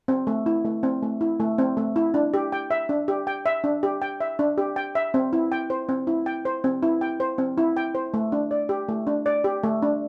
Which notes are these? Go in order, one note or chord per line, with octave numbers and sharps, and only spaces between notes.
C4
A3
E4
A3
C4
A3
E4
A3
C4
A3
E4
D4
G4
G5
E5
D4
G4
G5
E5
D4
G4
G5
E5
D4
G4
G5
E5
C4
E4
G5
C5
C4
E4
G5
C5
C4
E4
G5
C5
C4
E4
G5
C5
A3
D4
D5
G4
A3
D4
D5
G4
A3
D4